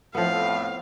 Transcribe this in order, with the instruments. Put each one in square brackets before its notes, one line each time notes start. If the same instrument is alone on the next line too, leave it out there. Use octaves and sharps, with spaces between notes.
[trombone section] F2 A2 [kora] F3 B3 [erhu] F5